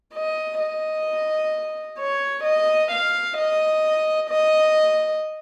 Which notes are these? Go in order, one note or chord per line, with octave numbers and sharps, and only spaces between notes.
D#5
D#5
C#5
D#5
F5
D#5
D#5